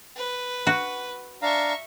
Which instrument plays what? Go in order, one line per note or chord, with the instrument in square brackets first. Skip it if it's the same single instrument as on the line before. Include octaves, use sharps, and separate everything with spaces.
[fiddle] B4
[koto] F#4
[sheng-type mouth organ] D4 F5 A#5 [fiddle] E5 C#6